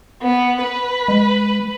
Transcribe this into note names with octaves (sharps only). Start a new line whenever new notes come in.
B3
B4
G#3